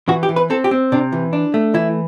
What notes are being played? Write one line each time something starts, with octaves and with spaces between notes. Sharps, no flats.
E3 F#4
G4
E3
B4
C4 A4
G4
C4
C3 D4
E3
D4
A3
E3 E4